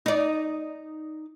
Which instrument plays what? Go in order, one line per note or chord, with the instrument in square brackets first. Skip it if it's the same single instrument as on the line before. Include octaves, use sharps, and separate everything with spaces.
[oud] D#4 D5